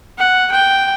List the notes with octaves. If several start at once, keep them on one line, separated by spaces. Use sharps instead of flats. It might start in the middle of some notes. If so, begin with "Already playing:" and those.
F#5
G5